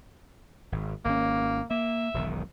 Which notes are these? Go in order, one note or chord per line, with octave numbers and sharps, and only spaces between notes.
G#1
G#1 A#3 C#4
A#3 E5
E1 B1 D#3